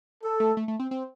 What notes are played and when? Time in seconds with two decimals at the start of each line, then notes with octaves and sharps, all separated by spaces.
0.23 A4
0.40 A3
0.57 A3
0.68 A3
0.80 C4
0.91 C4